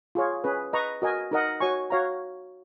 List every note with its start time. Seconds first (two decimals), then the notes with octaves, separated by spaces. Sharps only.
0.15 F4 G#4 C#5
0.44 C#4 G#4 B4
0.73 B4 D#5 A#5 C#6
1.02 F#4 A#4 D#5 G#5
1.31 D#4 A#4 D#5 F#5
1.60 F#4 C#5 G#5 C#6
1.90 F#4 C#5 F5 A#5